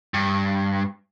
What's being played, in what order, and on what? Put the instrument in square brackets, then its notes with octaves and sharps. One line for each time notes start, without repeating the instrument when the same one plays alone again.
[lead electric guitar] G2